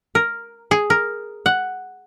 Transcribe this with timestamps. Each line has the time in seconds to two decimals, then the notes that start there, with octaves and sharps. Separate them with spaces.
0.15 A#4
0.71 G#4
0.90 A#4
1.46 F#5